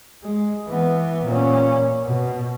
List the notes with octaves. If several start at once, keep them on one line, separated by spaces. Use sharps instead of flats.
G#3
E3 B3
A#2 C#4
B2